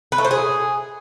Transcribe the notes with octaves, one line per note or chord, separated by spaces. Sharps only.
B4
A3
C5
G#4